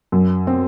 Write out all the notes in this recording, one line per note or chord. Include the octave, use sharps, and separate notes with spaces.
F#2
C4